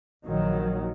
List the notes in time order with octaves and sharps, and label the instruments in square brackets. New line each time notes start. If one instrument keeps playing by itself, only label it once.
[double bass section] A#1 D#3 F#3